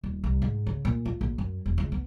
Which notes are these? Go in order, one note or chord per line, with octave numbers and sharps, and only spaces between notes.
D#1
C2
G#2
C#3
A#2
F4
A#1
F#2
E1
C#2
B3